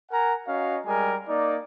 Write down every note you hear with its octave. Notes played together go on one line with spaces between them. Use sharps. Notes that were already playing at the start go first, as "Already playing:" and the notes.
A#4 F#5 G#5 A#5
C#4 F#4 D#5 F5
G3 G#3 A#4 G#5
A#3 D#4 D5